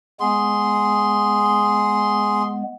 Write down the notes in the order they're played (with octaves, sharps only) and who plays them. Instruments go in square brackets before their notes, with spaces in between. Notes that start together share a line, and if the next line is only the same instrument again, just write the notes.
[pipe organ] G#3 B3 [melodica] G#4 C6